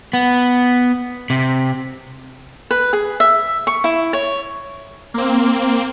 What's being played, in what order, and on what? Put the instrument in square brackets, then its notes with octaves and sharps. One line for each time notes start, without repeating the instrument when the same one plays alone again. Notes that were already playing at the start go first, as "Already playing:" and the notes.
[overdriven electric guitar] B3
C3
[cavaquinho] B4
G#4
E5
C#6
E4
C#5
[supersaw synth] A#3 C4